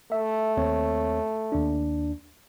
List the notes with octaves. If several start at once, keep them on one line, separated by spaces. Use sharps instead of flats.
A3 E5
D#2 C4 C#5
D#2 D4